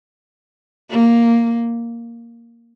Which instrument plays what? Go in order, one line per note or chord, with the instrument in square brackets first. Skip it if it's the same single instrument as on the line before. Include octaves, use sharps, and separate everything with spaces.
[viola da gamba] A#3